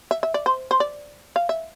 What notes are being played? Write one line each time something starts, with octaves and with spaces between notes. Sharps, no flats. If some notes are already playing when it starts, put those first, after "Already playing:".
E5
E5
D5
C5
C5
D5
F5
E5